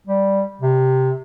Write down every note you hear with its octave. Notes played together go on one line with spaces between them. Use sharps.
G3
C3